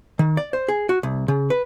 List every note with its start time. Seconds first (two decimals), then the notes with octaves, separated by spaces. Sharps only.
0.19 D#3
0.37 D5
0.53 C5
0.68 G#4
0.89 F#4
1.03 C2
1.28 C#3
1.50 B4